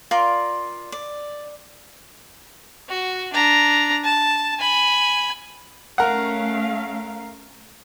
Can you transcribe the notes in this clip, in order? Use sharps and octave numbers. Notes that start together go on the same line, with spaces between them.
F4 A#4 D5 C6
D5
F#4
D4 A#5
A5
G#5 B5
A3 C#4 A#4 F5 F#5